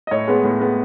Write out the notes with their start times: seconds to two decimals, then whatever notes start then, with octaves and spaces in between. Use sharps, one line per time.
0.07 D#5
0.11 A2 C#5
0.27 G#3 B3
0.44 A2
0.60 G#3 B3